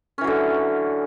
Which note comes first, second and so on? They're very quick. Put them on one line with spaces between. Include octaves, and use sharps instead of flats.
C#4 E3 F#3 D3